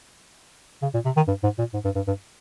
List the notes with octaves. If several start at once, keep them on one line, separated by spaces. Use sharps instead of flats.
C#3
A#2
C3
D#3
G2
G#2
A#2
G#2
G2
G2
G2